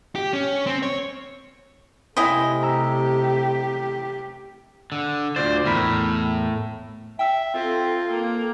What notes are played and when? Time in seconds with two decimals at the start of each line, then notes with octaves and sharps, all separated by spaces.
0.15 G4
0.33 C#4
0.67 C4
0.83 C#5
2.17 C3 A3 E4 C5 D#5 G5 G#5
2.63 G4 A#5 E6
4.92 D3
5.36 D2 F4 C5 D5
5.66 E2 A2 A#4 B5
7.19 E5 G5 E6
7.54 C4 F4 A4
8.11 A#3